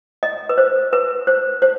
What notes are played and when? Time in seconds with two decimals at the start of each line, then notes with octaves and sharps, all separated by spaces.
0.23 D#5
0.49 B4
0.58 C5
0.93 B4
1.27 C5
1.62 C5